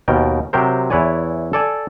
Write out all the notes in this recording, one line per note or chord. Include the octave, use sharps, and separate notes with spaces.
D#2 B2 A#4 G5
C3 F#3 G4 A#4 C5
E2 E4 B4 C#5 D5 G#5
A4 D5 G#5